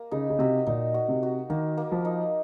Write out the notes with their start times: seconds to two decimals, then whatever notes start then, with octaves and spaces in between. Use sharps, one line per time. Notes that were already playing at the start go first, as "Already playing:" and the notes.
Already playing: A#3
0.11 C#3 D#4
0.30 C#3
0.39 C3 F#4
0.67 A#2 D#4
0.94 F#4
1.09 C3
1.23 F#4
1.50 D#3 A#3
1.77 A#3
1.92 F3
2.05 D#4